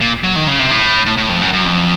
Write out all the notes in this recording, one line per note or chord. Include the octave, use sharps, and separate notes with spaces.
A#2
F#3
D#3
C#3
C3
A2
A2
A2
F2
F#2
F#2
F2